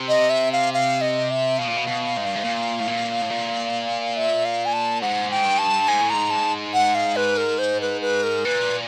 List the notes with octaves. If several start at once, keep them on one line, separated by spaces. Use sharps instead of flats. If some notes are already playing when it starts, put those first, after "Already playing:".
Already playing: C3
D#5
E5
F5
F5
D#5
E5
B2 F5
A#2
B2
B2
G#2
G2
G#2
A#2
A2
A#2
A2
A#2
E5
F5
G#5
A5
G#2 F#5
G5
G2
A5
G#2 G#5
A2
G#2 A#5
A5
F#5
F5
B4
A#4
C5
B4
B4
A#4
A#2 B4